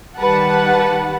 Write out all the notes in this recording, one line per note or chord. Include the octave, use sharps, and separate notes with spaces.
D#3 G3 B4 F#5 A5